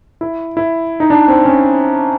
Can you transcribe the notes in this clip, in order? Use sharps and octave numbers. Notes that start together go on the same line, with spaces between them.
E4
E4
D#4
D4
C4
C#4